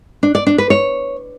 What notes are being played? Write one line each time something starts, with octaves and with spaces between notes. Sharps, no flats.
D4
D5
D4
B4
C#5